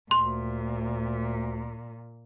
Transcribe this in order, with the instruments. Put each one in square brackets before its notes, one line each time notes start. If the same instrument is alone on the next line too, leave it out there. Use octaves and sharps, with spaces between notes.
[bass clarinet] D2 [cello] A#2 [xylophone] C6